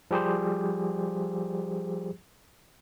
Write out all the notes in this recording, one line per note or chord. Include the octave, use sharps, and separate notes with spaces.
F3 G3 G4 G#4 C5